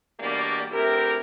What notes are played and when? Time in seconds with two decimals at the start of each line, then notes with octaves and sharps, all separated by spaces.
0.20 E2 B2 G3 A#3 D4 D5
0.71 D2 C3 E4 G4 A#4